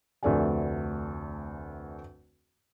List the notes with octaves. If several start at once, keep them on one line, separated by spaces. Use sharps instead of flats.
F1 D2 A3 A4 D5 G#5